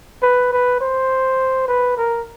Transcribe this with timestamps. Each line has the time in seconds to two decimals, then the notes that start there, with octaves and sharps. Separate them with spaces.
0.23 B4
0.53 B4
0.81 C5
1.68 B4
1.97 A#4